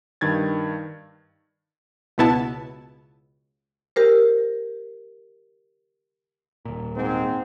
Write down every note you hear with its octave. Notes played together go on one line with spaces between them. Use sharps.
G2 D#3 G#6 A6
C#2 B2 B3 E4 A5
G4 A#4 C5
D#1 A#2
G#2 C4